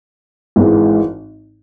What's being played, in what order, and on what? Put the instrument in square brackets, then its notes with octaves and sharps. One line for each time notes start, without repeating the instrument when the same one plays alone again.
[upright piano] G#1 G#2 E3 G#3 E4